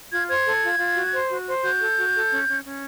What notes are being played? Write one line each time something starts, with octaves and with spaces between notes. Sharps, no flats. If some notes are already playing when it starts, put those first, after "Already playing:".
F4 G#6
C5 G#6
A4
F4
F4
F#4
C5
F#4
C5
F#4 G6
A4
F#4
A4
C#4
C#4
C#4